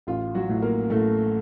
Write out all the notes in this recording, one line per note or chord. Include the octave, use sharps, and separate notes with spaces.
A1 F4
F#3 F#4
A2
A#3 A#4
A2 A3 A4